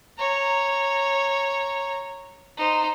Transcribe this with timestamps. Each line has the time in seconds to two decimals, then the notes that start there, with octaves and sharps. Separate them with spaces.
0.17 C#5 A#5
2.57 D#4 C5